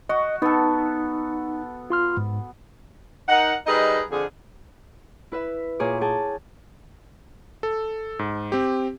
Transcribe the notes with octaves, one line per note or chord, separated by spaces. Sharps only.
F#4 D#5
B3 D#4 A4
F4 C6 F6
G#2
D#4 A#4 F#5
G3 D#4 G#4 A#4 B4 D#5
F2 D3 G#4
E4 B4 E5
A#2 A#3 G#4 C#5 D6
G#4 G5 A5
A4
G#2
C4 G4